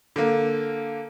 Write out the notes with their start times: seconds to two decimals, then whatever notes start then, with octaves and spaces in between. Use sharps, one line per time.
0.16 D3 A#3